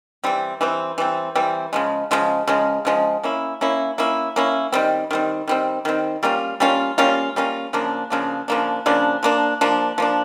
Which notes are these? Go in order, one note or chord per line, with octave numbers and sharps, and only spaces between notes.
E3 G3 C4
E3 G3 C4
E3 G3 C4
E3 G3 C4
C#3 F3 G#3
C#3 F3 G#3
C#3 F3 G#3
C#3 F3 G#3
A#3 C#4 E4
A#3 C#4 E4
A#3 C#4 E4
A#3 C#4 E4
D#3 G3 C4
D#3 G3 C4
D#3 G3 C4
D#3 G3 C4
G3 A#3 C#4 F4
G3 A#3 C#4 F4
G3 A#3 C#4 F4
G3 A#3 C#4 F4
C#3 F3 A#3 D4
C#3 F3 A#3 D4
C#3 F3 A#3 D4
C#3 F3 A#3 D4
F3 A#3 D4
F3 A#3 D4
F3 A#3 D4